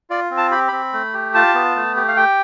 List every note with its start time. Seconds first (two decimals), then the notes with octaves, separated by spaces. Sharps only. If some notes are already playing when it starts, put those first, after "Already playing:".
0.10 F4 D5
0.31 C4
0.37 A5
0.51 G4 B5
0.68 C4 B5
0.93 A3
1.14 G4
1.35 F4 A5
1.54 B3
1.76 A3
1.96 G4
2.08 F5
2.17 G4 G5